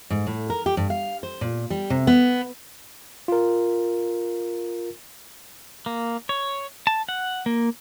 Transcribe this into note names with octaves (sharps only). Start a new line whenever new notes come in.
G#2
A2
A#4
G4
G2
F5
C5
A#2
G3
C3
B3
F4 A#4
A#3
C#5
A5
F#5
A#3